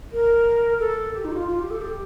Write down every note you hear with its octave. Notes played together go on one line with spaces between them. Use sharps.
A#4
A4
G4
D#4
G4
F4
F4
G4
A4
G4